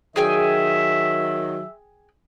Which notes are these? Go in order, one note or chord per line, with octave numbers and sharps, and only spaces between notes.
D#3 F#3 G#4 E5 G5 G#5